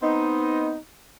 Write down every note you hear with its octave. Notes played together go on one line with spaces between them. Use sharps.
B3 C4 D#4